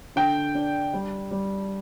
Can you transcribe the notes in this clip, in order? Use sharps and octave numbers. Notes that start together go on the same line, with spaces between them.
D3 G5
D4
G3
G3